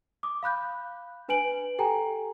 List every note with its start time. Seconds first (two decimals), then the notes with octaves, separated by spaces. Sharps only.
0.23 D6 D#6
0.43 F5 B5 F#6 G6
1.28 D4 B4 G#5 D7 F#7
1.79 G4 A4 G5 G#5 A#5